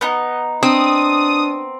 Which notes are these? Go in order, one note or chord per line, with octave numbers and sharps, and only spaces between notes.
B3 D#4
C4 D4 D#6